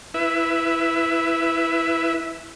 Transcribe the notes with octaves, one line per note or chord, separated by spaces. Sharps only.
E4 B4 E5